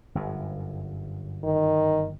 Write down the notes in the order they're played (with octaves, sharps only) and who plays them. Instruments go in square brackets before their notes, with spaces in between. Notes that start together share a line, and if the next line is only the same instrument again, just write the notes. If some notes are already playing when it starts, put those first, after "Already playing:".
[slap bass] G1 F#2
[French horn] D#3